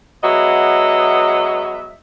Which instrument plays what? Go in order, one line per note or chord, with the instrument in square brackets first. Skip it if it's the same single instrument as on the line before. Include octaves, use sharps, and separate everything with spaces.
[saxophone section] F#3 G#3 B3 D#5 E5